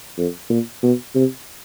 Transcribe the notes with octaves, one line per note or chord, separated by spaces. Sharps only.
F2
A#2
B2
C3